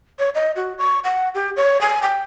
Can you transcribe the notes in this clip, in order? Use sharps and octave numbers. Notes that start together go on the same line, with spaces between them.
C#5
D#5
F#4
C#6
F#5
G4
C#5
G#5
G5